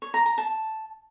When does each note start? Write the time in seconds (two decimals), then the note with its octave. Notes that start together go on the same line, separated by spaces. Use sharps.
0.02 C#5
0.14 A#5
0.26 A#5
0.38 A5